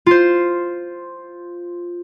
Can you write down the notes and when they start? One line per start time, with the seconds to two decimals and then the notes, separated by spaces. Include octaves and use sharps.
0.06 F4 C5